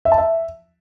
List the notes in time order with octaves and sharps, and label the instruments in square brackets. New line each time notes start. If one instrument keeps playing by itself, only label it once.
[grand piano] E5
A5
E5